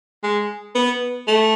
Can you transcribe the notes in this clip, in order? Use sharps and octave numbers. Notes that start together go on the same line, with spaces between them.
G#3
B3
A3